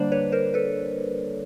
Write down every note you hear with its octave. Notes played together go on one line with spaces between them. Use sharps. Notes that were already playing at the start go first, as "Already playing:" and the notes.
Already playing: D3 G3 A#3 D4 C5 D5
B4 C#5
A#4 C5
A4 B4